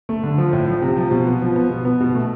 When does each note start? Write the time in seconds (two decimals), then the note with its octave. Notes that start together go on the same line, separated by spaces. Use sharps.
0.09 A3
0.23 D3
0.38 F3
0.53 A2
0.68 F3
0.82 C3
0.97 F3
1.11 B2
1.27 B3
1.42 F3
1.56 B3
1.70 B2
1.85 B3
2.00 B2
2.15 A3